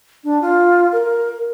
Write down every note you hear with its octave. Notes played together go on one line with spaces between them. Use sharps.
D4
F4
A#4